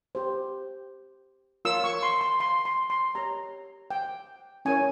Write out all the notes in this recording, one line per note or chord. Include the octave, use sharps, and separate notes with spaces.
G4 C5
F4 A#4 C#5 E6
C#6
C6
C6
C6
C6
C6
G4 C#5 A#5
G5
C#4 E4 A#4 C#5 G#5